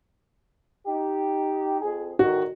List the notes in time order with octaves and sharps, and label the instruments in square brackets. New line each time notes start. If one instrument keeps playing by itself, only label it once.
[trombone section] D#4 G4
F2 G#4
[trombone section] E2 A2 D#3 [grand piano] F#4